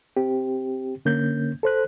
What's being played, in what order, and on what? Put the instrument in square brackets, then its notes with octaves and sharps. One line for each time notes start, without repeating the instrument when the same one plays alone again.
[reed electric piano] C4 G4
D3 A#3 C#4 G6
A4 C5 F#6